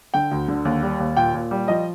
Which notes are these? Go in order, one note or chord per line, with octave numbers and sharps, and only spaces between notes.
D3 G5
D2
D3
D#2
G3
D#2
A#2 G5
A#2
G3
F3 D#5